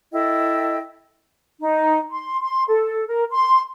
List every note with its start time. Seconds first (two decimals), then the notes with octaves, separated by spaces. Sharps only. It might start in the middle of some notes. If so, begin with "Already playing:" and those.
0.12 E4 A4 D#5 G5
1.60 D#4
2.10 C6
2.41 C6
2.68 A4
3.07 A#4
3.30 C6